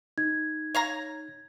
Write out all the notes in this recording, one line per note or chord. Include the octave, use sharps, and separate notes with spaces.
D#4 G#6
C#5 F5 A#5